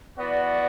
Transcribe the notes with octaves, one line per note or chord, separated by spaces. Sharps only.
E3 B3 F#4 D5